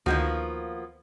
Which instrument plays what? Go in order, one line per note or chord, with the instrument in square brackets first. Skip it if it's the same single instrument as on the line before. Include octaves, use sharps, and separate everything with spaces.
[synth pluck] D2 D#3 [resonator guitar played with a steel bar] F3 A#3 B3 [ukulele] F#4